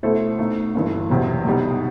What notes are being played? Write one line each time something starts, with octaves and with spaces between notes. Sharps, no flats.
B2 A3 E4 A4 C5
B2 A3 D#4
G1 G2 E3
F#1 E2 C3 F#3
B1 B2 G3 D#4